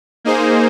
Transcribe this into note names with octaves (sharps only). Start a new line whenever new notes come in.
A#3 D#4 G#4 C5